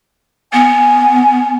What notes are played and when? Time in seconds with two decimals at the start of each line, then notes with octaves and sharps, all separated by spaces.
0.53 B3 G#5